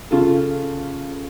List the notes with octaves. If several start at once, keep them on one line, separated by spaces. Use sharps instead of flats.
C#3 F4 A4